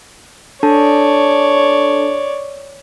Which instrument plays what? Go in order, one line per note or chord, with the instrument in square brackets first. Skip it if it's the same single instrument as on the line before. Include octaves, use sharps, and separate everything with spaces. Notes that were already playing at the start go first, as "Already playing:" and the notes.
[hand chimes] D4 A4 A5 [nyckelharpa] C#5 D5